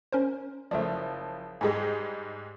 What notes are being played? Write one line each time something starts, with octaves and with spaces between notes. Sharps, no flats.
C#4 A#4 C5
F#1 F3 A3 C5 D5
G#2 G3 G#3 G#4 B4 G#5